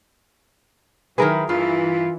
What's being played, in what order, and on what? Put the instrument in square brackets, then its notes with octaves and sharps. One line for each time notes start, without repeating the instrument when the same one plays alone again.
[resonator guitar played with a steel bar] D#3 E4 B4 [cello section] F#3 [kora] G#4 A#4
[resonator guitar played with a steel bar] G2 [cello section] E3 E4 [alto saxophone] F4